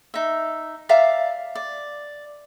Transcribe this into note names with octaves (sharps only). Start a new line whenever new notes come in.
D#4 E5
D5 E5 F5 A#5
D5